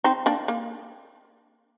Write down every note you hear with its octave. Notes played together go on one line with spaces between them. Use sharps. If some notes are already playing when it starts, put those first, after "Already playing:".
C4 D#4
A#3 D4
A#3